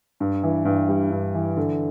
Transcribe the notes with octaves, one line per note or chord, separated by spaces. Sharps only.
G2
E3
G2
G3
G2
E3
D3